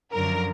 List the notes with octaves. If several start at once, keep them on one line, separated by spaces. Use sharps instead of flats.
F#2 D3 F3 A#4